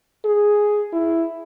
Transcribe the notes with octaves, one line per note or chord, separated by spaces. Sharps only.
G#4
E4